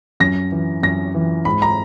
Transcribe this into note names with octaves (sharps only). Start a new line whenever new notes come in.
F#2 A#6
E3
F#2 A#6
E3
G#2 B5
A#5